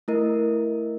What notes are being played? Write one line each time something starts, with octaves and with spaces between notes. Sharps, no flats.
A3 E4 A#4 D#5